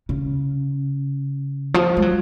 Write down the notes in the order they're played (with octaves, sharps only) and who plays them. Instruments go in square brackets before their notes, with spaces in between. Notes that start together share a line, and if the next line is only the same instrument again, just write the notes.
[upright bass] C#3
F3
G#3
F#3